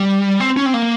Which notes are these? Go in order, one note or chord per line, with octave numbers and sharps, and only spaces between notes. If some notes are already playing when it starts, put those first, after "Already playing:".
Already playing: G3
C4
C#4
C4
A#3